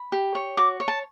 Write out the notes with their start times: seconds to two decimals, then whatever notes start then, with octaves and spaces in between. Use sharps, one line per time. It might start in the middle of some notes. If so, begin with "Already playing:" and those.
Already playing: B5
0.12 G4
0.35 C#5
0.57 F#4 D6
0.80 C#5
0.88 A5